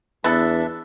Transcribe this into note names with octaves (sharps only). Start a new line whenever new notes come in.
E2 B3 D4 A4 E5